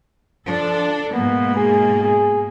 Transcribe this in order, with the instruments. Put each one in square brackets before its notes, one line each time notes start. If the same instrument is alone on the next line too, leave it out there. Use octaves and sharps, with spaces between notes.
[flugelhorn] F3 [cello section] D4 A4
[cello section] G#2 B2 A#3 [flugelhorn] B3
[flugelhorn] G#4
G#4